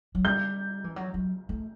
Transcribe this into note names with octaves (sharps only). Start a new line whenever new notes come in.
F#3
G3 G6
E3
F#3
F#3
A3